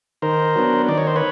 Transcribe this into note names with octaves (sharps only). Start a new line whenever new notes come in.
D#3 A#4 C5
F#3 B3 D4
D#3 D5
C#5
C5
B4 C#5